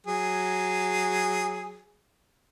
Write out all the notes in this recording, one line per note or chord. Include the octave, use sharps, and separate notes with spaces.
F#3 G#4